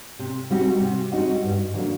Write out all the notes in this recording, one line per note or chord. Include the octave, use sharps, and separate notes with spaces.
C3
G3 C4 D#4 F#4
C3
G3 C4 D#4 F#4
G2
D3 F#3 A#3